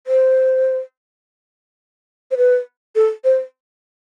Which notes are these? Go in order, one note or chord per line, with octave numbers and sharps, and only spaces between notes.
C5
C5
B4
A4
C5